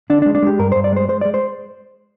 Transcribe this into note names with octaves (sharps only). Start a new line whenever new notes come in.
D3 D4
D4
G#3
D4
G#3 G4
G2 A#4
G2 C5
D5
G#3 C5
G#3 C5
G#3 D5
C5